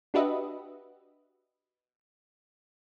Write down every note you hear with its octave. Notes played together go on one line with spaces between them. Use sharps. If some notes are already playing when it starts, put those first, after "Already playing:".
D4 F#4 G4 B4 D#5 E5